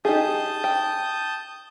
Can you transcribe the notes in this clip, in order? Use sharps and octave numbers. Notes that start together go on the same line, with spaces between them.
D#4 G4 G#4 A5 D#6 G6
G5